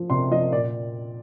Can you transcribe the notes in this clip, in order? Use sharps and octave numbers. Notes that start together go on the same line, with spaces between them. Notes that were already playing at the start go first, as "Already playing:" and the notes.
Already playing: F3
C3 C6
F3 D#5
A#2 D5